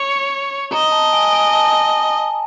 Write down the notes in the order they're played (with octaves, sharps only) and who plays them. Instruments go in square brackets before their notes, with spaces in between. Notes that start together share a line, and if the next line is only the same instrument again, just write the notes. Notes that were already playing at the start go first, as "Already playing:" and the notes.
Already playing: [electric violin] C#5
[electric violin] D#5 [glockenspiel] A#5
[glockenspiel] A5
G#5
G#5
A5